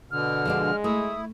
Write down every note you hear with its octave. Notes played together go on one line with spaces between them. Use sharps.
B2 D3 F6
F3 G#3 D4 D5
A3 E4 D#6